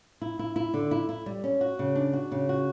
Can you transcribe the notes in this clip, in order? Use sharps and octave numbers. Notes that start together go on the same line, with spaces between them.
E4
E4
E4
D3
E4
E4
G3
C#4
F#4
C#3
D4
F#4
C#3
F#4